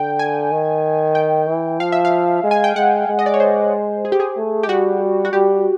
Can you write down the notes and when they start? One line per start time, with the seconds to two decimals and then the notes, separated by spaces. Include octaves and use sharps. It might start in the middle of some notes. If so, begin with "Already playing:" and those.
Already playing: D3 G5
0.19 G#5
0.51 D#3
1.15 G5
1.48 E3
1.80 F3 F5
1.92 E5
2.05 F5
2.44 G#3
2.51 G#5
2.64 G5
2.76 G#3 F#5
3.08 G#3
3.19 D#5
3.26 D5
3.34 C#5
3.40 C5
4.05 G#4
4.12 G4
4.20 G#4
4.37 A3
4.63 G4
4.69 G3 F#4
5.25 F#4
5.33 G3 G4